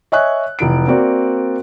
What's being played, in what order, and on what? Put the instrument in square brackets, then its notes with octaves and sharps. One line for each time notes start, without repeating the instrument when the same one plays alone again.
[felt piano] C#5 D#5 E5 G#5 C#6 F#6
F1 E3 D7
A#3 C4 F#4 D5